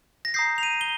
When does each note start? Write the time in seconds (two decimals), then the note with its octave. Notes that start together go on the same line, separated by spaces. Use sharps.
0.25 A#6
0.34 A#5 D#6 G6 C7
0.58 F7
0.63 D#7
0.81 G7